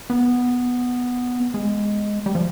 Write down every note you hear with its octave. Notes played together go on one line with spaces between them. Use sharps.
B3
G#3
G3
F3